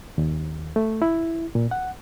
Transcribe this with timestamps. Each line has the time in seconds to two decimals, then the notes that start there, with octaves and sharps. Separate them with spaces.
0.18 D#2
0.76 A3
1.02 E4
1.55 A#2
1.71 F#5